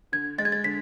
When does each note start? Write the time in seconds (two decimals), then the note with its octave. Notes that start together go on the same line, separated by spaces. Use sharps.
0.12 D3 G#6
0.38 G#3 A6
0.45 G#6
0.52 A6
0.64 D3 B6